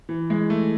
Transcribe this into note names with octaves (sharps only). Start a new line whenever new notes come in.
E3
G#3
A3